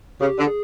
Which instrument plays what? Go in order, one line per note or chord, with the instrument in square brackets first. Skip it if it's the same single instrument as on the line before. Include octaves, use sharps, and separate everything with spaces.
[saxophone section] C#3 [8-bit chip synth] G4
[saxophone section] D3
[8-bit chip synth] G#4